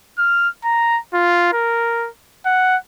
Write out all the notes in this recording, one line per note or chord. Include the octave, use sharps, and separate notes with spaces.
F6
A#5
F4
A#4
F#5